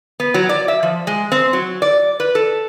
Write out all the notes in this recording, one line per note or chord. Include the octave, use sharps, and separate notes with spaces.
B3
F#3
D5
E5
F3
G#3
C4
F#3
D5
B4
A4